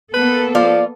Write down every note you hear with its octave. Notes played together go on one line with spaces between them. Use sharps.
A#3 B3 A4 B4
F3 F4 D5